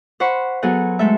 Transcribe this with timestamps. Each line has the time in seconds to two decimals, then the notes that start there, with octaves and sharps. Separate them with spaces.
0.20 C5 F#5 B5 C#6
0.62 F#3 B3 G#4 A4 F#5
0.99 G#3 A3 A4 E5